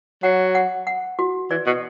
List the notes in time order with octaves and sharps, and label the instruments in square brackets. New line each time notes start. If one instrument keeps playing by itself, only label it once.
[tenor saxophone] F#3 [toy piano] F#5
[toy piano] F#5
F#5
F#4
[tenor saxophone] E3 [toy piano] D5
[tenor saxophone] B2